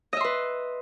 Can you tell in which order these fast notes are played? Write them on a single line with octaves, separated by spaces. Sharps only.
D#5 E5 C6 B4